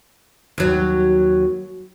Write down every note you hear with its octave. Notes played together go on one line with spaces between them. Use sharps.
D#2 F#3